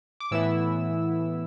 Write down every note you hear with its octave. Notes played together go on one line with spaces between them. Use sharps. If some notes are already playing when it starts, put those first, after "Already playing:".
D6
A2 E3 B3 E4 E6